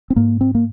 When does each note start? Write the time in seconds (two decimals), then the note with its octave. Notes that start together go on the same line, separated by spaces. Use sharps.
0.10 C4
0.16 G#2 A#3
0.41 C4
0.55 A#3